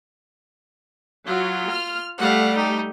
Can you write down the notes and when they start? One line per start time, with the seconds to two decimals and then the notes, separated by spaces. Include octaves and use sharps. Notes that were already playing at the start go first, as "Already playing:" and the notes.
1.26 F#3 F4
1.70 F6
2.18 G3 A3 F5 F#5
2.56 D#4 G4